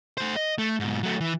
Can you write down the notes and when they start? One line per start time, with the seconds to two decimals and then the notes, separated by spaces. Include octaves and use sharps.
0.18 A3 C5
0.36 D#5
0.58 A3
0.80 G#2 B2
1.03 F#3 A3
1.21 E3